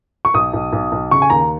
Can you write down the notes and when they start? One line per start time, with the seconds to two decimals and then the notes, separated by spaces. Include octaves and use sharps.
0.25 C#6
0.34 B1 D#6
0.53 B1
0.73 B1
0.92 B1
1.11 C#3 C#6
1.22 G#5
1.30 D#2 A#5